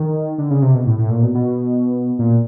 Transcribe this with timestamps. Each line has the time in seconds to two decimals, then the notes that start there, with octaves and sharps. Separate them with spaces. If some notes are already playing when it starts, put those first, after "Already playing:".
Already playing: D#3
0.38 D3
0.50 C#3
0.62 C3
0.74 B2
0.86 A2
0.98 A2
1.10 A#2
1.23 B2
1.35 B2
2.19 A#2